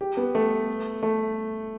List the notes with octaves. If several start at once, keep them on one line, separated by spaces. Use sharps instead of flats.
G4
B3
A3
A3